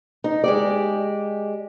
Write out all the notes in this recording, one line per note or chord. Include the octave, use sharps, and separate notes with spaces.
D#4
G#3 G4 D5